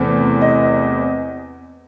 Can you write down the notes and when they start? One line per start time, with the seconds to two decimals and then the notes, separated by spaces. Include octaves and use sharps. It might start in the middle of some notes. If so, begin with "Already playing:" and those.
Already playing: E2 C3 E3 A3 C4
0.41 D#5